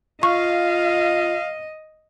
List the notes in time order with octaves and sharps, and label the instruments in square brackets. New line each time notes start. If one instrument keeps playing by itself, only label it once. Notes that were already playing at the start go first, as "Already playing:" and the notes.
[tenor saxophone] F4 [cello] D#5 [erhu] F5 [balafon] C#6